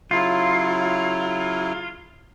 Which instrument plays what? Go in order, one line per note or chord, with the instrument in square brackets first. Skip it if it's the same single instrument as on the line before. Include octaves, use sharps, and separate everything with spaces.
[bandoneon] C#3 F#3 E4 [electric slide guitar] F4